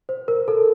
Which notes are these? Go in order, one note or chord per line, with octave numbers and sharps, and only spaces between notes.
C5
A#4
A4